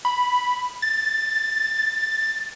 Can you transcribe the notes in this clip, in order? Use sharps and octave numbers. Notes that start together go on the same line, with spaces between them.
B5
A6